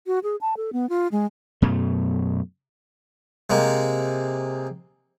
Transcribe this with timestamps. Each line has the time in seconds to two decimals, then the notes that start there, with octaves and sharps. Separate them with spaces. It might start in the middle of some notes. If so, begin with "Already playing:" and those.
0.07 F#4
0.23 G#4
0.41 A5
0.57 A4
0.73 B3
0.89 F4
1.12 G#3
1.62 F#2 B2 A3
3.50 C3 G#3 A#3